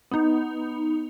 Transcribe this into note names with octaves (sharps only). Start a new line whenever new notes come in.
B3 D#4